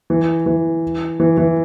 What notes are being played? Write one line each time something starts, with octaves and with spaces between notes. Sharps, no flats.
E3
E3
E3
E3